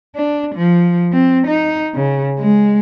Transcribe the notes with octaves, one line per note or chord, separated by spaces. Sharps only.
D4
F3
C4
D#4
C#3
G#3